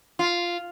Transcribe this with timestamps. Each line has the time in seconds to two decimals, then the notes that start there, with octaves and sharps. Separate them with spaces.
0.19 F4